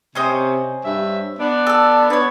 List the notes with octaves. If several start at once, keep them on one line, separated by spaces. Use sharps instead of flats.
C3 C#4 C5 D#5
G2 E5
B3 D4
A4 E6
B3 C#5 D5